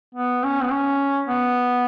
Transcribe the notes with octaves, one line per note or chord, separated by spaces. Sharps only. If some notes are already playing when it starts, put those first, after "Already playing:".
B3
C#4
B3
C#4
B3